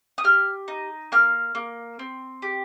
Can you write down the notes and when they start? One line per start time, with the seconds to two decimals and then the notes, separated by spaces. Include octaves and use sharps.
0.18 D#6
0.24 G4 F6
0.68 D#4
1.12 A#3 F6
1.55 A#3
1.99 C4
2.42 G4